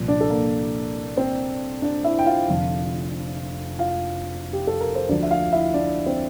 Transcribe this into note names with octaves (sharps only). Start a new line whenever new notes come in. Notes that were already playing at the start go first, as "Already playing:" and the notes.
Already playing: C2 A#2 F3
D4 D5
A4
A#3 A#4
C4 C5
D4 D5
E4 E5
G5
F4 F5
F1 F2 D3 F3
F4 F5
G4
A4
A#4
C5
D2 D3 F3 D4 D5
E5
F4 F5
E4 E5
D4 D5
C4 C5